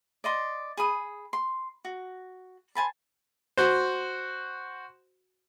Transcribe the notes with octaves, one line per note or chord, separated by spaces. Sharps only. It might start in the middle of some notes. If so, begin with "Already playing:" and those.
D5 D#5 C6
G#4 B5 D#6
C6
F#4
C5 G#5 A5 B5
F#4 C5